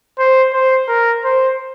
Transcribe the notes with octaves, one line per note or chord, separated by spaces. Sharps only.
C5
C5
A#4
C5